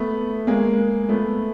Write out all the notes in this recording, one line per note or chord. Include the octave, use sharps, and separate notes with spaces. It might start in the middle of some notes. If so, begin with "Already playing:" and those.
Already playing: A3 B3
G#3 A#3
A3 B3